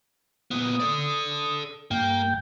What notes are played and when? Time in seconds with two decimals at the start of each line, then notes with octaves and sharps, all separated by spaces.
0.51 A#2 B3 D#6
0.80 A4 D5
1.91 G2 A#3 G5 G6